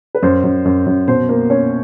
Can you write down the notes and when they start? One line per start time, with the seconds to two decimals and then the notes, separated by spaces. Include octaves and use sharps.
0.15 B4
0.23 F#2 C5
0.44 F#2
0.65 F#2
0.86 F#2
1.08 B2 C5
1.29 A#3
1.50 A#3 C#4 C#5